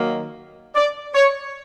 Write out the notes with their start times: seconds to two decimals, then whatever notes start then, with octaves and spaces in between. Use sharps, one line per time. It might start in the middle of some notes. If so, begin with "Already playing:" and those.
Already playing: D#3 F#3 A#3
0.75 D5
1.14 C#5